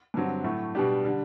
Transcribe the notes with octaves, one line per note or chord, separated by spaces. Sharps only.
G2 D3 F#3 C4
A2 F#3 A3
B2 G3 D4 G4
D3 G3